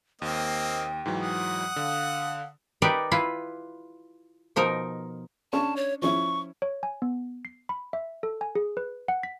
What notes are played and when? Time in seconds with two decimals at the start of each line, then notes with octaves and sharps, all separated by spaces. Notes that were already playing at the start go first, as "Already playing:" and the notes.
0.22 D#2 A#3 C4 D#5 G5
1.06 G#2 E3 F#3
1.22 F#5 D#6
1.76 D3 F5
2.82 D#4 G4 A#4 B4 D5
3.11 E4 F4 B4
4.56 B2 F3 D#4 A#4
5.53 C#4 D4 A5 C#6
5.76 C#5
6.02 F3 C#4 E4 C#6
6.62 C#5
6.83 G#5
7.02 B3
7.45 C7
7.69 B5
7.93 E5
8.23 A4
8.41 G#5
8.55 G#4
8.77 B4
9.08 F#5
9.23 B6